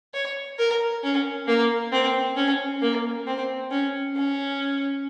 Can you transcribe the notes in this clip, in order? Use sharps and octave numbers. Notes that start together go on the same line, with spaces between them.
C#5
A#4
C#4
A#3
C4
C#4
A#3
C4
C#4
C#4